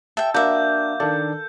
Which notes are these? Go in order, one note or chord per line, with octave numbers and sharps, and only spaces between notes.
E5 G5 A5 E6
A#3 D4 F#4 E5 G6
D#3 D4 A4 D5